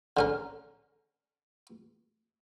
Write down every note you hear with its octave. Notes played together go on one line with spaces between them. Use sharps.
D3 C#4 A#4